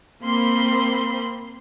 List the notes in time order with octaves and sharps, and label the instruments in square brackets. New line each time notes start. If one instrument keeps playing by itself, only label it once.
[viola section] A#3 C4 B5 C6